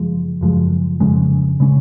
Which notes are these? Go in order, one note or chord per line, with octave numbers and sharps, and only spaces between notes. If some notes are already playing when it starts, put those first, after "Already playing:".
Already playing: F#1 F3 G#3
F#1 F#2 F3 G#3
F2 C#3 G#3 C#4
C#3 G#3 C#4